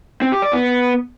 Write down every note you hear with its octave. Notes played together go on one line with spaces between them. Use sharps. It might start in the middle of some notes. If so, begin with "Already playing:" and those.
C4
G4
D5
B3